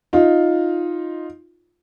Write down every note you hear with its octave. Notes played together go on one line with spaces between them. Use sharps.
D#4 F4